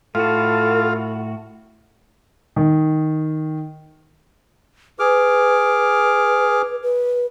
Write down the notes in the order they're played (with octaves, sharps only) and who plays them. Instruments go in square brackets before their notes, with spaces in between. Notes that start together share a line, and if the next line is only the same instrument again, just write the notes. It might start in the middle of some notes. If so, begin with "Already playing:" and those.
[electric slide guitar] A2 F#4 [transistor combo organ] F4 [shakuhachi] A4
[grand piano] D#3
[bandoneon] G#4 D6 F6 [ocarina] B4
[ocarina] B4